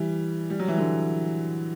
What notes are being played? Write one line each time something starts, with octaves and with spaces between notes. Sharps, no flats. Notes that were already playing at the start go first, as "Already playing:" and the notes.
Already playing: E3 G3
G3
F#3
E3
D3 F#3